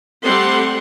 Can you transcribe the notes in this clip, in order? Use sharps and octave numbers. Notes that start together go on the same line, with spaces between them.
G3 A3 C4 A4 F#5 C6